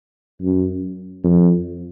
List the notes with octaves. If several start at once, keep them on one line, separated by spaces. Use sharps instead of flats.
F#2
F2